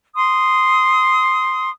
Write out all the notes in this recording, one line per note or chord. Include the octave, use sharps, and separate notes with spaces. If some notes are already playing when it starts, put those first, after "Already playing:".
C6 D#6